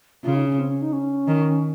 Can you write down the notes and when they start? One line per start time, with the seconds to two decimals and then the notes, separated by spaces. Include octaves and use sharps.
0.24 C#3 F4
0.35 D#4
0.47 C#4
0.58 C4
0.70 C#4
0.82 D#4
0.93 C#4
1.27 D#3